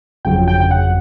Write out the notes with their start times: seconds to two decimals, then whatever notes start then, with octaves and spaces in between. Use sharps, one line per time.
0.25 G1 F2 C#3 F#3 G5
0.48 G5
0.60 G5
0.71 F#5